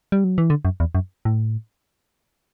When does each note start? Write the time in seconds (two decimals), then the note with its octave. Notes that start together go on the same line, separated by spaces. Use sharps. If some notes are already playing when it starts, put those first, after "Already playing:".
0.12 G3
0.24 F#3
0.38 E3
0.50 D3
0.65 F#2
0.80 E2
0.95 F#2
1.25 A2